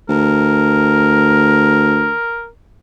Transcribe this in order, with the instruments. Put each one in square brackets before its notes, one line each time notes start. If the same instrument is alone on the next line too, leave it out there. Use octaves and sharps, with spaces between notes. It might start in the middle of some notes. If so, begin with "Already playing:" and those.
[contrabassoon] D2 [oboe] A#4